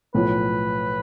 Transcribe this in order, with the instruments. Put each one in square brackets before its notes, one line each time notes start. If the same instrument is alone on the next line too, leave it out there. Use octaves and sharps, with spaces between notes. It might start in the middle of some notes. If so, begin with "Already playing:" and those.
[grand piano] B1 A2 F3 [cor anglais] B4